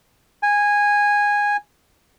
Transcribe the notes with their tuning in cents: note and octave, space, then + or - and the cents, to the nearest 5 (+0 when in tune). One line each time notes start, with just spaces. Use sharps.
G#5 -15